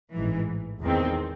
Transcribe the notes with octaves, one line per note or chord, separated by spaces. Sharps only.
A1 G#2 E3
E2 D#3 G#3 C4